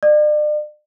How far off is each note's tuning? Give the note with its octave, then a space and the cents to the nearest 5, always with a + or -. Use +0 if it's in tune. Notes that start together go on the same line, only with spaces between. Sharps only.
D5 +40